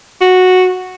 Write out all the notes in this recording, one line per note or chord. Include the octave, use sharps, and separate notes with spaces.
F#4